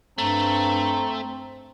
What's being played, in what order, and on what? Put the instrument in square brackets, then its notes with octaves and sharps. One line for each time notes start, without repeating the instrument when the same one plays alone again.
[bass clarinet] G2 [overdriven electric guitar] A3 [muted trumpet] C4 [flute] A#5